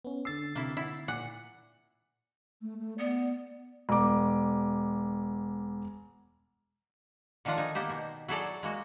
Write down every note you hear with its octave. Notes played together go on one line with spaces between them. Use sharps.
B3 C#4
D3 E6 A6 C7
C3 A#3 E4
E4 F#5
A#2 F#5 D6
A3
A3
B3 D5
E1 D6
D3 D#3 F3 D4 F4 F#5
D#4 G#5
A#3 B3 G4 C5
B2
F#3 E4 G#4 A4 D5 A#5
G#3 A#3 F#4